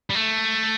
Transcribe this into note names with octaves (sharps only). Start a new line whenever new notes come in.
G3
A3